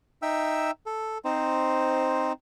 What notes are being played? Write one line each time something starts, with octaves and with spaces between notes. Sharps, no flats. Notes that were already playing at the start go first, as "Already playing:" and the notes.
D#4 E5 G5 E6
A4
C4 D#4 C5